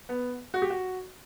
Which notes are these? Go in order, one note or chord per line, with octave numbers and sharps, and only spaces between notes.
B3
F#4
G4
F#4